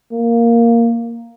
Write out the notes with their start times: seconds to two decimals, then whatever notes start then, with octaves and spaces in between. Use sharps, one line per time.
0.12 A#3